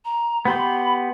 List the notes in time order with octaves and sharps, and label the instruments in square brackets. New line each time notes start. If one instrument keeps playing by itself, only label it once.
[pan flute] A#5
[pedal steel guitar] B3 G4 C6 [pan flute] B5